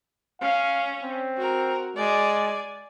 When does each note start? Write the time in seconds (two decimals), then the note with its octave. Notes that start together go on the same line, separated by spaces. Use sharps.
0.41 C#4 F5
1.03 C4
1.37 F#4 A#4
1.96 G#3 D5 G#5